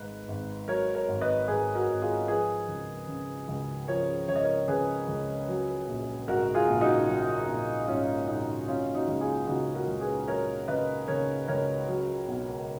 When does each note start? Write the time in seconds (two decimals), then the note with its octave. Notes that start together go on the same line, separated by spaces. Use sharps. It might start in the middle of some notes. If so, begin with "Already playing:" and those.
Already playing: G#1 G#2 B4
0.28 G#1
0.68 F#3 A#4 C#5
0.95 A#4 C#5
1.08 G#1
1.21 B4 D#5
1.48 G#2 G#4 B4
1.75 F#4 A#4
1.88 G#1
2.02 F4 G#4
2.28 F3 G#4 B4
2.68 C#2
3.08 C#3
3.48 C#2
3.88 F3 A#4 C#5
4.28 C#2 C#5
4.36 D#5
4.43 A#4 C#5
4.68 C#3 G#4 B4
5.08 C#2
5.48 F#3
5.88 A#1
6.28 G#2 F#4 A#4
6.55 F4 G#4
6.68 A#1
6.81 D#4 F#4
7.08 F#3
7.48 A#1
7.88 G#2 C#4 F4
8.28 A#1 D#4
8.68 F#3 C#4 F4
8.95 D#4 F#4
9.08 C#2
9.21 F4 G#4
9.47 C#3 D#4 F#4
9.74 F#4 A#4
9.88 C#2
10.01 G#4 B4
10.28 F#3 A#4 C#5
10.68 C#2 B4 D#5
11.08 C#3 A#4 C#5
11.48 C#2 A#4 C#5
11.88 F#3
12.28 B1